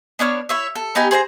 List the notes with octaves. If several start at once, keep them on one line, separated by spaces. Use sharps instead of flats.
B3 D4 C#5 F6
E4 C#5 E5
A4
B3 D#4 G4 G#5
G#4 C5 G#5 A#5